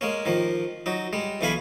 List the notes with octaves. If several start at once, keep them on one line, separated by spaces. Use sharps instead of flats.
G#3 A#3 C#4
D#3 F3 A#3
F#3 D#4
G3 G#3
B1 E3 D4 F5 G#5 B5